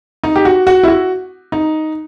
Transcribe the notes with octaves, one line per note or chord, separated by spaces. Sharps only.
D#4
G4
F#4
F#4
E4
F#4
D#4